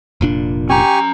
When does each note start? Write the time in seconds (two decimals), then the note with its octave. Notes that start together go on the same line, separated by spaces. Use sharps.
0.21 F1 A#2 D4
0.70 C#4 G4 G#5 A#5 C#6